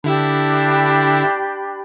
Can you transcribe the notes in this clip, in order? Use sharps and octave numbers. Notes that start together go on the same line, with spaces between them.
D3 D4 E4 G4 B5 E6